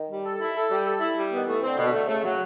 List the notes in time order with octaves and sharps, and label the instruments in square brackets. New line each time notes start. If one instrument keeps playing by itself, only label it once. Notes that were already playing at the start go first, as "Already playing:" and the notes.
Already playing: [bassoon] D#3
[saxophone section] G3
A4
E4
A4
G3
A4
E4
G3
B3
[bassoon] D#3
[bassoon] E3 [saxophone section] A3
[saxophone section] C4
[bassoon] D3
[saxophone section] B2
[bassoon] D3
[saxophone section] A3
[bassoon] C#3 [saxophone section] A3
[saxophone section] F#3